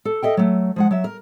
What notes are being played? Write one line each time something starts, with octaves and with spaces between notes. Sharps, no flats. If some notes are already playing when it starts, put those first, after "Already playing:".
A4
A4 D#5 E5 G5
F#3 A3
F3 G#3 F#5
F#3 E5
A#4